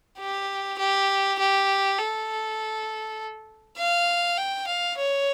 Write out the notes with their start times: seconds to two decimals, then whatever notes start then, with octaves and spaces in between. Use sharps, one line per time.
0.19 G4
0.79 G4
1.39 G4
1.98 A4
3.78 F5
4.37 G5
4.67 F5
4.98 C#5